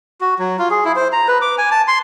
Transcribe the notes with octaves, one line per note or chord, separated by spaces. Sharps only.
F#4
F#3
F4
G#4
E4
C5
A#5
B4
D6
G#5
A5
C6